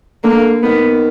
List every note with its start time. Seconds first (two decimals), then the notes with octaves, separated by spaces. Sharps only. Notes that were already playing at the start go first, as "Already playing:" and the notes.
0.24 D3 A#3
0.63 D#3 B3